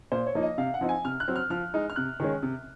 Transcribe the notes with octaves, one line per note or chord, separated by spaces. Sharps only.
A#2 C5
C#5
F3 A#3 D#4
D#5
C3 F5
F#5
F3 C4 D#4
G#5
C3 F6
F#6
F#3 C4
F6
F3 F6
G#3 D#4
F6
C3 F#6
D#3 G#3 C#4
C3